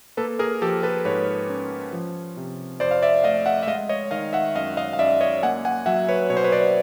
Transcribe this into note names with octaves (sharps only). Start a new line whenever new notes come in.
A#3 A4 B4
G#4 A#4
F3 G4 A4
A4 B4
G#2 B4 C#5
C#4
F3
C3
F2 C5 D5
F5
D5 E5
A3 D#5 F5
E5 F#5
E5
G#3 D#5 F5
C#5 D#5
D#3 D#5 F5
E5 F#5
F#2 D#5 F5
D#5 F5
F5
F#2 D5 E5
C#5 D#5
A#3 F#5 G#5
F#5 G#5
F#3 E5 F#5
B4 C#5
B2 C#5
C5
B4 C#5
C5 D5